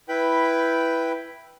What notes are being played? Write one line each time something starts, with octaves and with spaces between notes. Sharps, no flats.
E4 B4 G5 B5